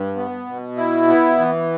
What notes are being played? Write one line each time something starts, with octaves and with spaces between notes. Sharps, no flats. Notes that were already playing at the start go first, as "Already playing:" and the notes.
Already playing: G2
B3
B2
E4
B3
E3